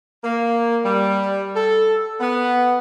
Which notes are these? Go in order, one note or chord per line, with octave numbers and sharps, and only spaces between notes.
A#3
G3
A4
B3